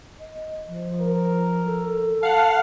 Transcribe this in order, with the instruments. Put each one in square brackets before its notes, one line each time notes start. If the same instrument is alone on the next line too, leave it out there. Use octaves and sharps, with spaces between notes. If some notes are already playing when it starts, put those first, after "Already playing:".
[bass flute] D#5
F3
[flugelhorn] A#4
[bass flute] A4
[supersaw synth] F5 F#5 [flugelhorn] A5